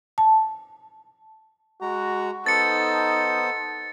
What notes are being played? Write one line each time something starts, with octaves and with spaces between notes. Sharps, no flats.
A5
G#3 F#4 A#5
B3 D#4 A4 C5 D#6 A6 C#7